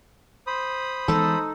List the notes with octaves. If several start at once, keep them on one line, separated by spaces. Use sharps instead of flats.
C5 B5 D#6
E3 G#3 B3 D#4 A4